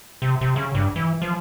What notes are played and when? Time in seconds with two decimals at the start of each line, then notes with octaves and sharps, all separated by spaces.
0.22 C3
0.41 C3
0.56 C#3
0.75 G2
0.96 E3
1.22 F3